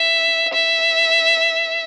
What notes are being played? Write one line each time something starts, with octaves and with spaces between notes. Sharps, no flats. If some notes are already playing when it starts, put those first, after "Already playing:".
Already playing: E5
E5